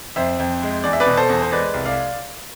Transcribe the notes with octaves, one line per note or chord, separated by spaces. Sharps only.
F2 C5 E5
F2
G#3
E2 D5
E5
B4 D5
B2
A4 C5
E2
C5
G#3 B4 D5
C2
D5 F5